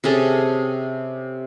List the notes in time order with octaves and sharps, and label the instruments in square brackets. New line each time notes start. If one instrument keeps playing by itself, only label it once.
[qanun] C3 C#4 G#4 A4